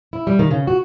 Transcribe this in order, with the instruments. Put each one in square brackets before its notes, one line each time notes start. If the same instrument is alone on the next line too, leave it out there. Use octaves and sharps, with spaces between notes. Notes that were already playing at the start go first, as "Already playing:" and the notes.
[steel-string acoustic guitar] E4
G3
D#3
C#3
F#4